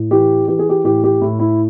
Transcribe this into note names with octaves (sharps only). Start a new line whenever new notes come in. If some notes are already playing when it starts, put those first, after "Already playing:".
Already playing: A2
E3 G4
E3 G4
G#4
G4
A2 G4
G4
A2 E4
E4